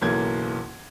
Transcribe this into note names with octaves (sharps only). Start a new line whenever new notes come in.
F#1 B1 E3 A#3 G#6